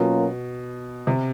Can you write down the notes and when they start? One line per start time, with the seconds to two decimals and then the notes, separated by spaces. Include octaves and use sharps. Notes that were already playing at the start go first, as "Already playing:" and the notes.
Already playing: B2 F#3 A#3 C#4 F4 A#4
1.07 C3